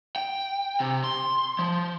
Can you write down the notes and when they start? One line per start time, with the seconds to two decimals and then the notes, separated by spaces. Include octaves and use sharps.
0.16 G5
0.80 C3
1.04 C6
1.59 F3